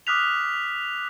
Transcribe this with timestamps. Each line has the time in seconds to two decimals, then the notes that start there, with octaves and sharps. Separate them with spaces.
0.07 D6 D#6 F6 F#6 B6 F7